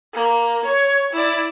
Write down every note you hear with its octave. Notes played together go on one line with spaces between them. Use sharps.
A#3
C#5
E4 D5